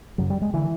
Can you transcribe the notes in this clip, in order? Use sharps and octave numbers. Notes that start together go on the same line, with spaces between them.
F#2 C#3 F#3
G3
G#3
D3 E3